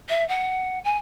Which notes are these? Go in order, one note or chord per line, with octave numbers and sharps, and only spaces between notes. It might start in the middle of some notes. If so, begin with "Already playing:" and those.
E5
F#5
G#5